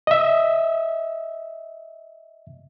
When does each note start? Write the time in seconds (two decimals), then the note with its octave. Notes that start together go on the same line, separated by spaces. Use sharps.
0.07 D#5 E5